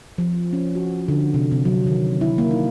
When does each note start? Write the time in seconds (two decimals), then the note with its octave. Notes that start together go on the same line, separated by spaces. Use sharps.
0.18 F3
0.53 C#4
0.75 F#4
1.08 D3
1.34 C3
1.51 C3
1.65 F#3
1.87 D#3
2.21 E4
2.38 A#3
2.51 D#4